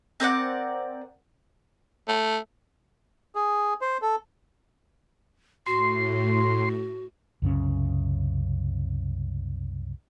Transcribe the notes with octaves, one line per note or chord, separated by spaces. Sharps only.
C4 A#4 D5 F#5
A3
G#4
C5
A4
A2 F#4 C6
C2 F#2 C#3 C#4